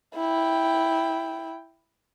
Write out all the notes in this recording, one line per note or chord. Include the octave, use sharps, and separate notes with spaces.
E4 G5